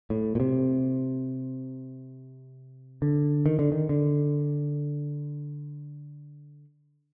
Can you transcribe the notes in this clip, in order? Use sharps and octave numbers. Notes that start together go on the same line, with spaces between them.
A2
A#2
C3
D3
D#3
D3
D#3
D3